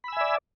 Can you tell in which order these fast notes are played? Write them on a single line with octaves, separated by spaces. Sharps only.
B5 E6 G#5 E5 D5